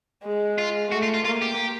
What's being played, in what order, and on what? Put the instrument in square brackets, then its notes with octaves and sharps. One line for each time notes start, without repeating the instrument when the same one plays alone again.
[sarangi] G#3
[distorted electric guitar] F4
[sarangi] A3 [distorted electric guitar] F#4
[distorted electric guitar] F4
F4
[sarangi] A#3 [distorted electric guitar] F4
[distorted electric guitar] G4